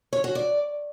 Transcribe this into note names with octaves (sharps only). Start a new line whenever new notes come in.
C#5
F#4
D5